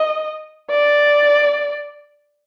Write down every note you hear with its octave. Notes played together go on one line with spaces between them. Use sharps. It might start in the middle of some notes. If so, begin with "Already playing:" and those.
Already playing: D#5
D5